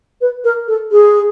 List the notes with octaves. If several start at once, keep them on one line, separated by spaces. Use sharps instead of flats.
B4
A#4
A4
G#4